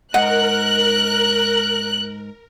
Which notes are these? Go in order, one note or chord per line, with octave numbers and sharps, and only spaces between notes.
G#2 A#4 D#5 F#5 F#6